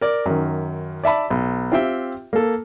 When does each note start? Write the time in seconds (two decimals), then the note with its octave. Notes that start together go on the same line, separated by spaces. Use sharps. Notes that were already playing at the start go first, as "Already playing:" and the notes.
0.01 A#4 D5
0.26 F#2 D#3
1.04 D5 E5 A5 B5
1.30 B1
1.72 C4 F4 G4 E5 G5
2.33 A#3 A4